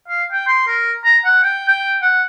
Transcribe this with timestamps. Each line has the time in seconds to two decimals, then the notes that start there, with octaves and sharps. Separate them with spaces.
0.08 F5
0.32 G5
0.47 C6
0.67 A#4
1.04 A#5
1.25 F#5
1.44 G5
1.68 G5
2.02 F#5